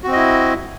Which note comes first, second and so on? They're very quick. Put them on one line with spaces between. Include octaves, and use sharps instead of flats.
F#4 C4 D#5 E4